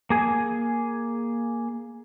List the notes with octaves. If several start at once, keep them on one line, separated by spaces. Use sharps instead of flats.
A#3 G#4 G#5